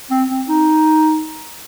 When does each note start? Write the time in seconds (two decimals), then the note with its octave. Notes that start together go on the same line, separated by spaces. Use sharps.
0.10 C4
0.29 C4
0.47 D#4